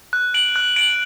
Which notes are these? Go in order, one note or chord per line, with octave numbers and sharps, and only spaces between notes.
F#6
D7 F#7
F#6
D7 F#7